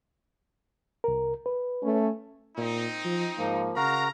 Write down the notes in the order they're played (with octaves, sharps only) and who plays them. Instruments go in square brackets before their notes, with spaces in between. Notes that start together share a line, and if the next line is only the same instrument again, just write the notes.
[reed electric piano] C2 A#4
B4
[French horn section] A3 C#4
[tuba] A#2 [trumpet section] C4 D#4
[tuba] F3
[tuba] G#2 [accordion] F3 A#3
[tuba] C#3 [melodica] F#4 A#4 [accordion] F5 [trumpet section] A#5